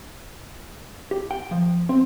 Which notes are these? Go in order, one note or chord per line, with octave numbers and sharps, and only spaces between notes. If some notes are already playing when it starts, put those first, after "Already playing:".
G4
G5
F3
C4